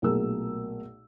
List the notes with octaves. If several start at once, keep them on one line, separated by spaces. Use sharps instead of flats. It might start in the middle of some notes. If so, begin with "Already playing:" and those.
B1 A#2 A3 G#4 A#4 E6